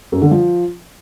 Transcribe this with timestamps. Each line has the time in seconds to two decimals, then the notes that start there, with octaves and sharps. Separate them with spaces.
0.12 F#2
0.22 D3
0.31 F3